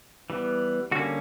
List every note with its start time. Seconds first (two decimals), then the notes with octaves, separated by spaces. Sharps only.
0.30 E3 G3 B3
0.91 D3 G3 A#3 C#4 F#4